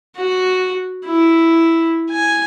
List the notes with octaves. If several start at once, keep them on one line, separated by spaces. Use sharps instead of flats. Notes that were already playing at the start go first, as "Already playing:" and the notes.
F#4
E4
G#5